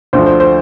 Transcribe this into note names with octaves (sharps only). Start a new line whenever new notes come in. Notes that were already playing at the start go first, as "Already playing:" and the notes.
D2 D3 F3 C5
C5
C5